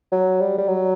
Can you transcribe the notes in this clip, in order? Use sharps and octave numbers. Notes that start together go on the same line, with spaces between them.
F#3
G3
G3
F#3